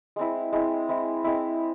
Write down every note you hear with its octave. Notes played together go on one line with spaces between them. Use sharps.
G#3 C4 E4
G#3 C4 E4
G#3 C4 E4
G#3 C4 E4